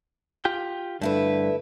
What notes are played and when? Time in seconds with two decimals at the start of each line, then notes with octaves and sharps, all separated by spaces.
0.45 F4 G4 G5
1.01 G2 D3 A3 E4 B4